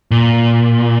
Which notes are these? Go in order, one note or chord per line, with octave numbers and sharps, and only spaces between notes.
A#2